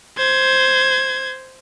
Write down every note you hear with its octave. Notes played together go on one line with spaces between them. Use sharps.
C5 G#6